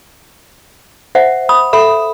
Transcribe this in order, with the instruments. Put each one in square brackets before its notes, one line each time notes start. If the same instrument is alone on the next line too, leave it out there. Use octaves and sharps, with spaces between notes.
[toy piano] C5 E5 F#5
[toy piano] B5 [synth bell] D#6
[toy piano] A4 [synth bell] E5 B5